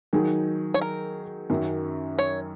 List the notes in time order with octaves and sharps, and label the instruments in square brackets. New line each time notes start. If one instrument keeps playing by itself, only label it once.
[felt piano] D#3 F#3 D#4 G#4
[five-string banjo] C#5
A#4
[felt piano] F#2 D#3 F#3 C#4
[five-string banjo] C#5